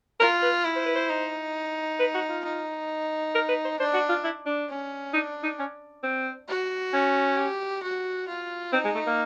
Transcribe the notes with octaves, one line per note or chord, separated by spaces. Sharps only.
F4 A#4
B4
E4
C5
B4
C5
D#4
B4
F#4
F4
D#4
A#4
B4
C5
D4 C5
F#4
F4
E4
D4
C#4
D4 D#4
D#4
C#4
C4
F#4
C#4
G4
F#4
F4
C4 D#4
G#3
A3
A#3